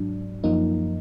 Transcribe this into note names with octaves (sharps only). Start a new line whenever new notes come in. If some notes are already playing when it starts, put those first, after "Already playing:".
Already playing: G#2 F#3 D4
F#2 F3 A#3 D#4